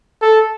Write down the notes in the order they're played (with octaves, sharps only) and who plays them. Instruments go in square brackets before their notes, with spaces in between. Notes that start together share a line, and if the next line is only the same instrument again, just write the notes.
[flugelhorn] A4